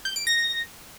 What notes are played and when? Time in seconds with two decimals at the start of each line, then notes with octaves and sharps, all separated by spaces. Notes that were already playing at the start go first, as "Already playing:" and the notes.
0.05 G6
0.16 D7
0.27 A#6